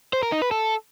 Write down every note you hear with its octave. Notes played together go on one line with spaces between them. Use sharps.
C5
A#4
D#4
B4
A4